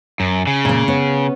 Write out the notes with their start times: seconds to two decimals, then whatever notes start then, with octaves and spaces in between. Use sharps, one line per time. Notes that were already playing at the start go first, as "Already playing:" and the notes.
0.20 F#2
0.47 C#3
0.65 A#2 A#3
0.88 B3 C#4